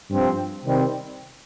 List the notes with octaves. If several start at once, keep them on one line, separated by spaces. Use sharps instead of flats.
G2 F3 C4
C3 D#3 G3 C4